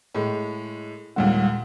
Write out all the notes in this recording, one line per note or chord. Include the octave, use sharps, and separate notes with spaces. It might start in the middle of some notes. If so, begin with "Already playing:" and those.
A2 G#3
D#2 A#2 D3 G3 G#3 F#5